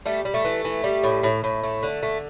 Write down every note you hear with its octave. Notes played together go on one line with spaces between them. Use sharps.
G3 A3
G3
A3
E3
E3
G3
A2
A2
A2
A3
D3
A3